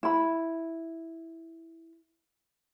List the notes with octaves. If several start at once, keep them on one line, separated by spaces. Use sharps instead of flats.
E4 B5